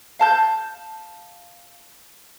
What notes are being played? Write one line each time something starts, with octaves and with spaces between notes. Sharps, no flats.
F5 A5 G6